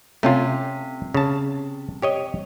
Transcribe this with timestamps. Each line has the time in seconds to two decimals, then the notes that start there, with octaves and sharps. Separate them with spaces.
0.23 C3 A3 C#4 F4
1.14 C#3 A5
2.02 G4 C#5 D#5